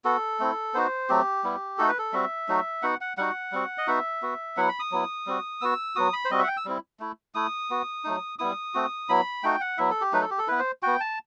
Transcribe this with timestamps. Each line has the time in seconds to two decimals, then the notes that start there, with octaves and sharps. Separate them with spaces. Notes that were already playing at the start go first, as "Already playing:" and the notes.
0.04 B3 F#4 A4
0.39 A3 C4 E4
0.74 B3 D#4 F#4 C5
1.09 F#3 A3 C4 G4
1.44 G3 B3 E4
1.78 A3 D#4 F#4 A4
1.88 B4
1.98 A4
2.13 G3 C4 F#4 E5
2.48 F#3 A3 D#4 F#4
2.82 B3 D#4 F#4 F#5
3.01 F#5
3.17 G3 D#4 F#4 F#5
3.52 G3 C4 F#4
3.78 D#5
3.87 B3 D#4 F#4 E5
4.22 B3 F#4
4.57 F#3 B3 E4 F#5
4.69 B5
4.80 D#6
4.92 F#3 B3 E4
5.27 G3 C4 F#4
5.61 B3 F#4 E6
5.96 F#3 B3 F#4 D#6
6.13 B5
6.25 C5
6.31 G3 C4 F#4 D#5
6.39 E5
6.44 F#5
6.48 G5
6.57 E6
6.65 G3 C4 E4
7.00 A3 E4
7.35 A3 E4 D#6
7.70 B3 F#4
8.04 F#3 A3 D#4
8.39 G3 B3 E4 D#6
8.74 A3 C4 F#4
9.09 F#3 B3 E4 B5
9.43 A3 D#4 F#4 G5
9.61 F#5
9.78 F#3 B3 E4 E5
9.91 A4
10.01 G4
10.13 F#3 A3 D#4 B4
10.22 A4
10.31 G4
10.38 A4
10.47 B3 E4 B4
10.59 C5
10.83 B3 F#4 G5
11.00 A5